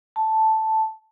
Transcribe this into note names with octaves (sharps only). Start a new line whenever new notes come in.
A5